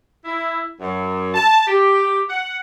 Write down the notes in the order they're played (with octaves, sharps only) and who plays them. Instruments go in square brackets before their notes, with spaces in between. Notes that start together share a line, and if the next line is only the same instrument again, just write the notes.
[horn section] E4
F#2
A5
G4
F#5